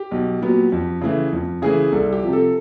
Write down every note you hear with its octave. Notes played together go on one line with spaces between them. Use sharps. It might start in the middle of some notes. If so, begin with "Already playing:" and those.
Already playing: G4
B1
A#2 F#3 B3
F2
C#3 E3 A3
F2
C#3 E3 A3 G#4
C2 A4
G4
C3 F3
A4